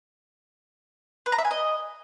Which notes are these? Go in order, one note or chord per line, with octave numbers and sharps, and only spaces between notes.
B4
A#5
E5
G#5
D#5